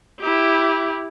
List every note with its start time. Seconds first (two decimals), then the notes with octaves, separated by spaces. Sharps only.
0.20 E4 G4